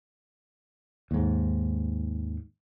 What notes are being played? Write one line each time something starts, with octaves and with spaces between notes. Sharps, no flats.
D#2 G#2